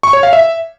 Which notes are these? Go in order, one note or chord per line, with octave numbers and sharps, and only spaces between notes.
C#6
C#5
F5
E5